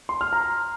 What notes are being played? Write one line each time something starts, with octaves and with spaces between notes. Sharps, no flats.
C6
F6
A#5